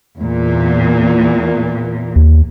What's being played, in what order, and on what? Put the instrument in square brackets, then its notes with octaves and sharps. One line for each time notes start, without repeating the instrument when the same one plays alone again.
[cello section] E2 A#2
[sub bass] D#2